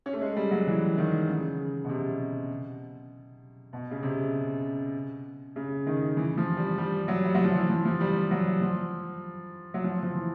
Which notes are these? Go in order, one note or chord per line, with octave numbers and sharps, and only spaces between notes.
C#4
A3
G#3
G3
F#3
E3
D#3
C#3
B2
C3
B2
C#3
C3
C#3
D#3
E3
F3
G3
G3
F#3
G3
F#3
F3
E3
F3
F3
G3
F#3
F3
F#3
F3
F3
E3